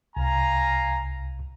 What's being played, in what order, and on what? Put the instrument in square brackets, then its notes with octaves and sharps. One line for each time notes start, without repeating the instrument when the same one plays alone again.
[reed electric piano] C2 [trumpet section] F5 G#5 A#5